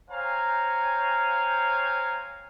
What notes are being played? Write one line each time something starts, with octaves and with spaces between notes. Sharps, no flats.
C5 C#5 F5 G5 G#5 A#5